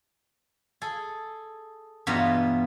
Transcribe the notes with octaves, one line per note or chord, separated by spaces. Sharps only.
G#4 A4
E2 G2 B2 B3 F4 A#5